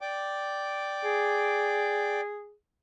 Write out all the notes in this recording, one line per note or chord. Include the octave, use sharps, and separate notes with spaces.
D5 G5 D6
G#4